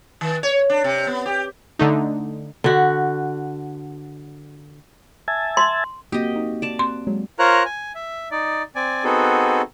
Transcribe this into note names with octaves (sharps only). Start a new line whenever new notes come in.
D#3
C#5
D4
C3
B3
G4
D3 A3 D#4
D3 F#4
E5 G#5 A5
C6
A#3 C4 F#4 G4 D#5 D#6 G6
D#4
D5 A5
C4 C6 F#6
F#3 G#3
F4 A#4 C5 C#5 A#5 F#6
G#5
E5
D#4 D5
C4 D5 G#5
B3 C4 D#4 F#4 G#4 A4